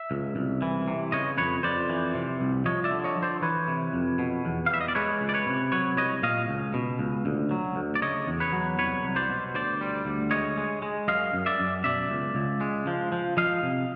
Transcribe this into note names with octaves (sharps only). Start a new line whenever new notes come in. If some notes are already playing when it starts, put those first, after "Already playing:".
Already playing: E5
C#2
C2
E3
C3
C#3 C#5 D#5
F2 B4 C#5
F2 C5 D5
E3
C3
C2
F3 C#5 D#5
D5 E5
D3
C#5 D#5
F3
C5 D5
E3 B4 C#5
C3
F2
B2
E2
F5
G3 E5
D#5
D5
G#3 B4 C#5
C#2
D5
B4 C#5
C3
F#3 B4 C#5
C2 C#5 D#5
A#2 D#5 F5
C#2
B2
C#2
D2
F#3
D2
D5
C#3 C#5 D#5
E2
B4 C#5
F#3
C2 B4 C#5
C2
C5 D5
B2
D2 C5 D5
G3
D2
G#3 C#5 D#5
G#3
G#3
F#2 D#5 F5
F#2
D5 E5
F#2
B2 D5 E5
C#2
C#2
G#3
F3
F3
F3 D#5 F5
C3